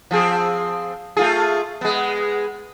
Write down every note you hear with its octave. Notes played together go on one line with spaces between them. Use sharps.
F3 C4 G#4
A3 F4 G#4
G#3 B3